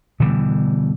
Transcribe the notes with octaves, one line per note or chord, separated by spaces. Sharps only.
B2 D3 E3 G3